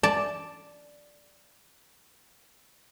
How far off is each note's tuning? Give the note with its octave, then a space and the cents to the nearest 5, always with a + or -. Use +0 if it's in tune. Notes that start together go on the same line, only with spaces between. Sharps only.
D5 +0 A5 +0